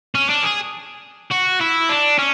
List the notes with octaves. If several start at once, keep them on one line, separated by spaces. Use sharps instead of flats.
C#4
D4
G#4
F#4
E4
D4
C#4